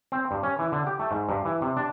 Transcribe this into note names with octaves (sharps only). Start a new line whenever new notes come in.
C4
G2
C#4
E3
D3
G4
A3
G#2
G2
E3
C3
D4